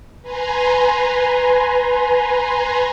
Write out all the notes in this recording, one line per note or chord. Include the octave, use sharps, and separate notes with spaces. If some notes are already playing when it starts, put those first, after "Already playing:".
B4 G#5 A#5 C6